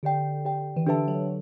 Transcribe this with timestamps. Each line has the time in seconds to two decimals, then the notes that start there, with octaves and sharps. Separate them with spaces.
0.03 D3 G4 D5 G5
0.45 G4 D5 G5
0.76 E3
0.87 D3 D4 G4 B4 E5 A5
1.08 F#3